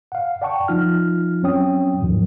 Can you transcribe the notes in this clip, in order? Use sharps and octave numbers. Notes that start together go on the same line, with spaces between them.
F5 F#5
D5 F#5 G5 A5 C#6
F3 D#4 F4 F6
F#3 C4 C#4 C#5 G5 D#6
D#2 G#2 D#3 F3 F#3